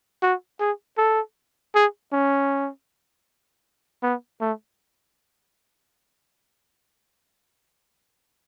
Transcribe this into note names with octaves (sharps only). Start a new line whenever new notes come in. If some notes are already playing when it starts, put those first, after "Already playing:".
F#4
G#4
A4
G#4
C#4
B3
A3